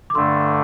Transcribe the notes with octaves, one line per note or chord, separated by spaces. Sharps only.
D6
G2 D3 A3 D4 C6 E6